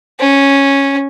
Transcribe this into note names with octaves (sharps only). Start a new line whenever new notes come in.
C#4